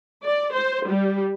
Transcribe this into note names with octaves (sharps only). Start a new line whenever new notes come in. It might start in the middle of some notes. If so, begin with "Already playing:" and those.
D5
C5
G3